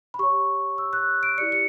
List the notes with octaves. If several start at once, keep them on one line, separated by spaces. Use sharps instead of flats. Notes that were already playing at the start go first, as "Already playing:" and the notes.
B5
G4 C#5 C#6
E6
F#6
D7
E4 G4 D5 C#7
C#7